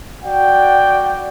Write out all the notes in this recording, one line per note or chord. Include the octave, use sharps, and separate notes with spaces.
F#4 D5 F#5 G5